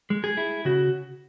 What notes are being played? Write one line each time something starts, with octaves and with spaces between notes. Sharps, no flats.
G#3
G#4
E4
C#3 F#4